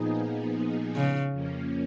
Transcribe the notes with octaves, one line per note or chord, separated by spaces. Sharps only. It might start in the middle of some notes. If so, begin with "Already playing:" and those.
Already playing: A#2 F3 B3 D#4 G#4
C#3
F2 F3 A#3 C#4